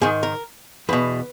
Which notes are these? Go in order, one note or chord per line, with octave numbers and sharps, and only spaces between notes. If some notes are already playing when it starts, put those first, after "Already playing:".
G#2 D#3 G#4
A#4
E2 B2 B4